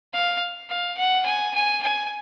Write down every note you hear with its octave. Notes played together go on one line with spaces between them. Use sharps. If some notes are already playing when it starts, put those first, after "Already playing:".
F5
F5
F#5
G#5
G#5
G#5